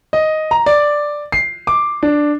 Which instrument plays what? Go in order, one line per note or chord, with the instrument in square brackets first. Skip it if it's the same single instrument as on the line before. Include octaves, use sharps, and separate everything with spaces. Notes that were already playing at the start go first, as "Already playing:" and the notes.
[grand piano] D#5
A#5
D5
C7
D6
D4